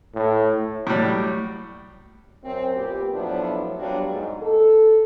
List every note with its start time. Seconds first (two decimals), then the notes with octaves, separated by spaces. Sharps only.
0.14 A2
0.87 A2 F#3 G3
2.43 F#2 C4
2.76 A#2 B3 G4
3.13 A2 F3 F#3 B3 D4 E4
3.78 F#3 G3 B3 D4 F4 F#4
4.09 G#2
4.42 A4